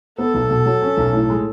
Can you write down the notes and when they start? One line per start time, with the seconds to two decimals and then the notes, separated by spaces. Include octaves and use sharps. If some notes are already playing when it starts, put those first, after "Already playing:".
0.18 B3 A4
0.34 B1
0.50 B2
0.66 F#3
0.81 C#4
0.97 B1
1.13 A2
1.30 G#3